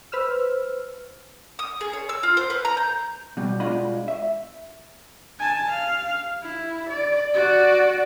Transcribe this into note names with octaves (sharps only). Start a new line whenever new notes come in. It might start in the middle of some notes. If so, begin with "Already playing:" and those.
B4 C5 E6 F6
D#6
G#4
C#5
E6
F4
C5
B4
A#5
G6
B2 G3
B2 G#3 D4 F4 D#5 B5
E5
G#5 A5
F5
E4
D5
F#4 D5